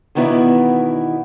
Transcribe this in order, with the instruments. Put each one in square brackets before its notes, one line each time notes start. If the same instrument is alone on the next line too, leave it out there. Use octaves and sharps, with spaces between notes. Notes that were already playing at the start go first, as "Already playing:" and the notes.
[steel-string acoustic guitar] E2 B2 D#3 B3 E4 D5